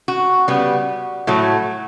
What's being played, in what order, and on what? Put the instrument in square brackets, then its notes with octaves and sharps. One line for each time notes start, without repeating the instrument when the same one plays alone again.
[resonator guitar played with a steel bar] F#4
C#3 G3 B3
A2 F#3 A3